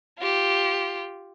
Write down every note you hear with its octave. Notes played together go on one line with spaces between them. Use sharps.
F4 G4